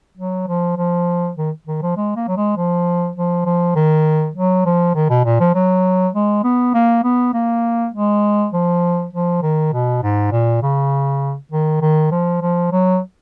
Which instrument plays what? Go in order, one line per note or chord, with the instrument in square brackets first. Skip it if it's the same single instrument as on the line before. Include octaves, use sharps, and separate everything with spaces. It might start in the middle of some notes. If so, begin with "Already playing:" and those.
[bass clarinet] F#3
F3
F3
D#3
D#3
F3
G#3
A#3
F#3
G#3
F3
F3
F3
D#3
F#3
F3
D#3
B2
A#2
F3
F#3
G#3
B3
A#3
B3
A#3
G#3
F3
F3
D#3
B2
G#2
A#2
C#3
D#3
D#3
F3
F3
F#3